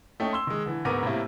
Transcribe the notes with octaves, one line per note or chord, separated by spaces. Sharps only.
A3 C#4 D#4 G5
C6 E6 G7
D#3 G#3
D3 E3
D2 G#2 B3 A#4 D6 D#7
A2 C3 G3 A#3 E4